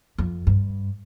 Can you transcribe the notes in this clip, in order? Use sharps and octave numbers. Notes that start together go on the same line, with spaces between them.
F2
G2